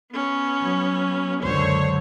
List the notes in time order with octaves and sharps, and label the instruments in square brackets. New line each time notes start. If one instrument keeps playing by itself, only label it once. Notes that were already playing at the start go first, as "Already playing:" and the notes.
[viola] B3 C#4
[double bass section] F#3
[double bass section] C#2 F#2 D3 [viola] C5 C#5